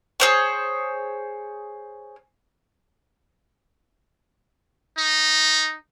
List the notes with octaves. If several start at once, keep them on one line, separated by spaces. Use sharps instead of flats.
G#4 C5 C#5
D#4